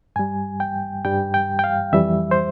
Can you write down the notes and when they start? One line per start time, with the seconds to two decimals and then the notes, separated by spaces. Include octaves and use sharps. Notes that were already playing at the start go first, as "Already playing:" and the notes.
0.16 G2 G3 G#5
0.60 G5
1.04 G2 G3 G5
1.34 G5
1.59 G5
1.64 F5
1.93 F2 E3 G3 E5
2.31 C5